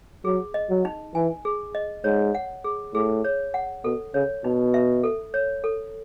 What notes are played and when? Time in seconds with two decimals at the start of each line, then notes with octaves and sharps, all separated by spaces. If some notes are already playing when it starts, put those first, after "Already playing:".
0.25 F#3 G#4
0.54 D#5
0.70 F#3
0.85 D#4
1.15 E3 G#5
1.45 G#4
1.75 D#5
2.04 G#2 C#5
2.35 F#5
2.64 G#4
2.94 A2 G#4
3.24 C#5
3.54 F#5
3.84 B2 A4
4.14 C#3 C#5
4.44 B2 D#4
4.74 E5
5.04 A4
5.34 C#5
5.64 A4